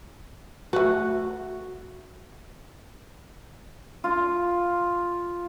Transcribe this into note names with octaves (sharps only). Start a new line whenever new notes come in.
A3 F#4 B4
F4